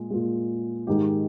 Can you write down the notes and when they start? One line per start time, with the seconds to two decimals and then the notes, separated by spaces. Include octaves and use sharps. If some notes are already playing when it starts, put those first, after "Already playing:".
Already playing: A#2 G#3
0.10 A#2 G#3
0.87 G#2 D#3 G#3 G4